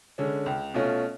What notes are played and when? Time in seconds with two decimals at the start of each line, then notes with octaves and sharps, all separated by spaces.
0.18 D3 G#3 C#4
0.46 C#2
0.74 B2 A3 C#4 F4